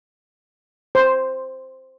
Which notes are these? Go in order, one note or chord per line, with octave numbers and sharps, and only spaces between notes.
C5